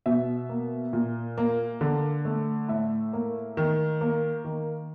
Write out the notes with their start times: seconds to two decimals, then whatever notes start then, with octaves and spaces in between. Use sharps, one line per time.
0.06 B2 E5
0.49 A#3
0.93 A#2
1.38 A#3
1.81 D3
2.25 A3
2.68 A2 E5
3.13 A#3
3.57 D#3
4.01 A#3
4.45 D#3